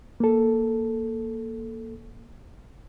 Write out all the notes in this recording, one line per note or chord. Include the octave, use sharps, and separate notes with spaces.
A#3 A4